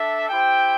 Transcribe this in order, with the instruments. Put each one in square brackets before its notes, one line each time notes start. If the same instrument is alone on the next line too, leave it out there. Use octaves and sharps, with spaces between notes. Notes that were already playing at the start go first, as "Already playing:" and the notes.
Already playing: [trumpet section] D4 A4 E5
E4 G4 C5 G5